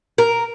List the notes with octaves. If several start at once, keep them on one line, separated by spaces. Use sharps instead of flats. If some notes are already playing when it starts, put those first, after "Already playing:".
A#4